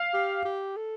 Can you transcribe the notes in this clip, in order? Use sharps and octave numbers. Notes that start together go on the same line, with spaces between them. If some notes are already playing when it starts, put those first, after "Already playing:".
Already playing: F5
G4
G4
A4